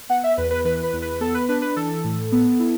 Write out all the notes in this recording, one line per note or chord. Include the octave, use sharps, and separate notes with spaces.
B3 F#5
E5
E2 B4
B4
E3 B4
B4
E2
B4
B3 A4
B4
D4 B4
B4
E3 A4
A2
B3
E4